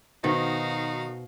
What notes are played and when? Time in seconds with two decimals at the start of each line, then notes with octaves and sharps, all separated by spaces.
0.24 B2 D#3 D#4 F#4 B4 C5 F5